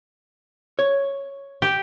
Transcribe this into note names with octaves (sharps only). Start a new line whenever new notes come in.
C#5
G4